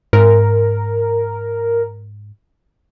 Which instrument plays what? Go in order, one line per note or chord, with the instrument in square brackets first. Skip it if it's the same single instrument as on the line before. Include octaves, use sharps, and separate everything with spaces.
[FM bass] G#2 [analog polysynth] A#4